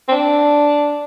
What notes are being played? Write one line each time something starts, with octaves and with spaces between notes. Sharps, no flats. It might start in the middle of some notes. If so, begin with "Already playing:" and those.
C4
D4